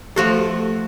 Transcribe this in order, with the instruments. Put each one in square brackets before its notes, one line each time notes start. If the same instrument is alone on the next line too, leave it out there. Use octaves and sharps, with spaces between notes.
[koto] F3 F#4 A4 [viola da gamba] A3 [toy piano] G4